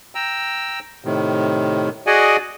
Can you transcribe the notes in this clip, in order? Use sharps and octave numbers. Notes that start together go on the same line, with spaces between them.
G5 A#5 E6
A2 C3 D#3
F#4 G#4 D5 D#5 F#5 G#5